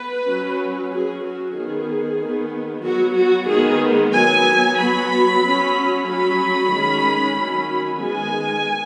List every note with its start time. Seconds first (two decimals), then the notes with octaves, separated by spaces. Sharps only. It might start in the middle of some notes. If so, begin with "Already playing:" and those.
Already playing: B3 B4
0.27 F#3 C#4
0.91 F#3 C#4 G#4
1.24 F#4
1.56 D#3 B3 G#4
2.20 D#3 B3
2.85 F#3 B3 F#4
3.17 F#4
3.49 D#3 G#3 B3 G#4
4.14 F#3 B3 G#5
4.78 F#3 B3 B5
5.43 F#3 C#4
6.07 F#3 C#4 B5
6.72 D#3 G#3 C#4
7.37 D#3 F#3 C#4
8.01 D#3 G#3 B3 G#5